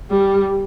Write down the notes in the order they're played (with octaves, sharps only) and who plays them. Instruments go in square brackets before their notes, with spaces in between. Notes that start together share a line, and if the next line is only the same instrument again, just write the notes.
[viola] G3